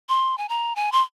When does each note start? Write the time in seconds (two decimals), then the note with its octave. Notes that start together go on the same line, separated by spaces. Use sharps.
0.09 C6
0.38 G#5
0.49 A#5
0.76 G#5
0.92 C6